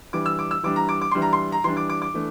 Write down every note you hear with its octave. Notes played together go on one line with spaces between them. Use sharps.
E3 G3 D4 D6
E6
D6
E6
E3 G3 D4 D6
A#5
D6
D6
E3 G3 D4 C6
A#5
C6
A#5
E3 G3 D4 C6
D6
D6
D6
E3 A3 D4